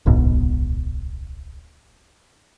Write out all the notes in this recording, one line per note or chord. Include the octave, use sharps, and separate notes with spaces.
D1 B1 G#2 B2